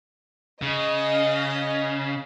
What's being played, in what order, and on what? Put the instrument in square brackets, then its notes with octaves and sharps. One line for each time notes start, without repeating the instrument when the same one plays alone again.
[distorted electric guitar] C#3 [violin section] D#5